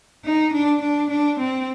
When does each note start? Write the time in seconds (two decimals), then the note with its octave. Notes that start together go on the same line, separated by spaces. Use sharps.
0.25 D#4
0.53 D4
0.82 D4
1.10 D4
1.39 C4